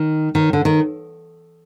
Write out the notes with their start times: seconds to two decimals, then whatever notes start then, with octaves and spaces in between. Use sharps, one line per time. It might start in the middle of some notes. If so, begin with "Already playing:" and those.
Already playing: D#3
0.35 D#3
0.53 D3
0.65 D#3